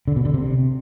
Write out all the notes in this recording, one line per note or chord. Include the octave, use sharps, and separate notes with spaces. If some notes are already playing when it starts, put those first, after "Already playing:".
D3
B2
D3
C3